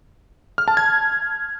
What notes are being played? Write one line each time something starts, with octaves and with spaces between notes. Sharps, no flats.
F6
A5
G#6